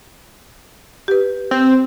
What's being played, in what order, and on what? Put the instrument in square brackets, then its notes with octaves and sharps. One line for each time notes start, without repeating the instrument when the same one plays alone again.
[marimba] G4 B4
[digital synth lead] C4